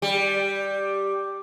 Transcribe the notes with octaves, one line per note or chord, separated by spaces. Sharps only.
G3